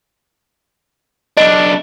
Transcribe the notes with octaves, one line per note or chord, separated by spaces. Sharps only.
B1 D4 D#5